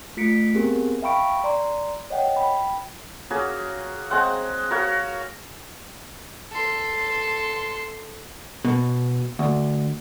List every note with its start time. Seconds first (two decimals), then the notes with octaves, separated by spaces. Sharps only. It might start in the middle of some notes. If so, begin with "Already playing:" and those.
0.17 A3 F4 B6 C#7 D7
0.54 B3 C4 G4 G#4 A#4
1.02 E5 F5 G5 B5 C#6 D7
1.44 D5 A#5 C6
2.10 C#5 D#5 F#5 G5
2.36 G5 B5
3.30 A#3 C#4 F#4 G#4
4.10 G#3 C4 C5 F#5
4.71 F#4 A#4 C#5 F5
6.51 A4 C6
8.65 B2
9.39 D2